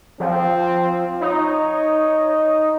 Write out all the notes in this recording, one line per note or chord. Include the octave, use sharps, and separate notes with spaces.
F3 C4
D#4 C#5